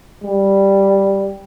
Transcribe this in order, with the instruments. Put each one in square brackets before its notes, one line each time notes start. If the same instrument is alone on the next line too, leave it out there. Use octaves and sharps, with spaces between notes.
[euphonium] G3